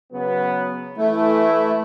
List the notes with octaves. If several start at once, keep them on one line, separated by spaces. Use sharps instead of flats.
C#3 F#3 B3
E3 A3 E4